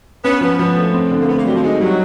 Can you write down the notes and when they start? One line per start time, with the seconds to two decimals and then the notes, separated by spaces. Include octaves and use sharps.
0.24 B3 C#4
0.41 F3 B3
0.59 F3 B3
0.76 A3
0.93 C4
1.11 D3
1.21 A#3
1.28 A3 B3
1.37 A#3
1.45 F#3 G3
1.55 F3
1.63 G#3 D#4
1.81 F#3 G3